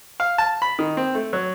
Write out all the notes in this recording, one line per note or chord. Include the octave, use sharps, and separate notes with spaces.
F5
A5
B5
D#3
C4
A3
F#3